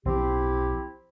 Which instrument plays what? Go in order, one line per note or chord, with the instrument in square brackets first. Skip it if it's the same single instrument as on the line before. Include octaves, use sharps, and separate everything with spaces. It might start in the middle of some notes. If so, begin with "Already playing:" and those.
[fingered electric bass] B1 F3 [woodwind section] C4 E4 G4